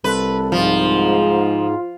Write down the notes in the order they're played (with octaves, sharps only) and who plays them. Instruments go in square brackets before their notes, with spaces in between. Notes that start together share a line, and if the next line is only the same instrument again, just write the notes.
[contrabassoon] C2 [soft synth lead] A4 [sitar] B4
[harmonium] G#2 [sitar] F3 [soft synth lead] F4